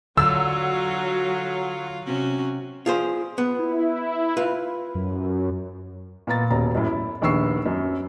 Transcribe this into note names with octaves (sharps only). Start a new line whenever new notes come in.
D3 F#3 F4 E6
C3 C#4 F#4
F4 G#4 C5
B3
E4
F4 B4
F#2
A#2 B3 A#5 A6
D#1 B2 A#5
F#2 A2
E4
A#1 D#2 B3 C#6 E6 C7
F#2